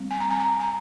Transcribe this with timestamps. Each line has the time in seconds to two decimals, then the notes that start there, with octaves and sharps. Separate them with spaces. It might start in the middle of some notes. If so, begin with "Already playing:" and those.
Already playing: G3 C4
0.11 G#5
0.20 A#5
0.30 G#5
0.40 A#5
0.60 G#5